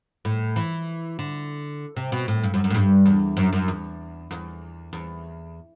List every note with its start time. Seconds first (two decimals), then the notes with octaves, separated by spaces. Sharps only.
0.25 A2
0.56 E3
1.19 D3
1.96 C3
2.12 B2
2.28 A2
2.44 G2
2.54 F#2
2.64 F#2
2.70 A2
2.75 G2
3.06 E2
3.37 F#2
3.53 F#2
3.68 E2
4.31 E2
4.93 E2